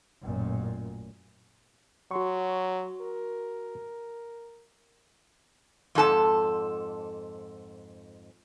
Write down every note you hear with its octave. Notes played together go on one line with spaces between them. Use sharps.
A1 F#2 A#2
F#3 F#4 C6 C#6
A#4
F2 G#2 A4 A5